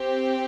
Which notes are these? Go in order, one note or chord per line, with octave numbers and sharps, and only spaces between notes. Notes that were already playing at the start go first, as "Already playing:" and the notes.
Already playing: C4 G4